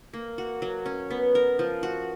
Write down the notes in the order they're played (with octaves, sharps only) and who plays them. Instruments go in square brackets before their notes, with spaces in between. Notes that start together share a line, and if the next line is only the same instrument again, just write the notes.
[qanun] A#3
F#4
F#3
C#4
B3
A#4
F3
F#4